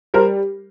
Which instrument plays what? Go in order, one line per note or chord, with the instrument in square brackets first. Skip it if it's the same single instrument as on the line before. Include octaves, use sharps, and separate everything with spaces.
[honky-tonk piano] G3 A#4 C5